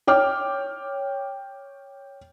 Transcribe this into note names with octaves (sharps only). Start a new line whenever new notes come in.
C#5 G5 D6 F6